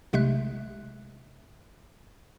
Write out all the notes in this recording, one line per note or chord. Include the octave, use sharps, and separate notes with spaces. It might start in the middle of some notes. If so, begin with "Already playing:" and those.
B1 C3 G#3 A3 E5 F#6